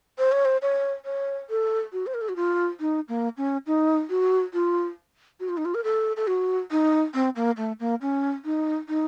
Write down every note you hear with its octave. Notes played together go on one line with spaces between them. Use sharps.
C5
C#5
C5
C#5
C#5
A4
F#4
C5
A#4
A4
F#4
F4
D#4
A#3
C#4
D#4
F#4
F4
F#4
F4
D#4
F4
A#4
A4
A4
F#4
D#4
C4
A#3
A3
A#3
C#4
D#4
D#4